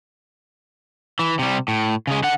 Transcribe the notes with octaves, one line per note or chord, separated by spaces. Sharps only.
E3
C3 G3
A2
C#3 G#3
D3 F#5